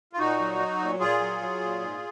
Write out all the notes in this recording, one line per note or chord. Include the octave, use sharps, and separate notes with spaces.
F4
A#2 D#4 F#4
F#3
F#3
A#2
A#2 F4 G#4
F#3
F#3
A#2
G#2